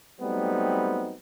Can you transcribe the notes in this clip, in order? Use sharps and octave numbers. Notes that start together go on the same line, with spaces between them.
F#3 G3 A3 B3 C4 D#4